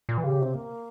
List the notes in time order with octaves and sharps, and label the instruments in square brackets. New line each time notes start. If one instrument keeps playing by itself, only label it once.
[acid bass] A#2
E3
[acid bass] C#3 [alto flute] G4
[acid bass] C3 [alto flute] C4
[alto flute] A#3